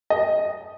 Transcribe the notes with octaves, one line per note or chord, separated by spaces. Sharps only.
D#5